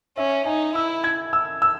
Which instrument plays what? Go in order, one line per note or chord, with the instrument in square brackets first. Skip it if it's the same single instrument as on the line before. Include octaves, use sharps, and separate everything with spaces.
[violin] C#4 [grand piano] E5
[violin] D#4 [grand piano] G#5
[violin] E4 [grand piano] E6
[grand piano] G#6
E6
E6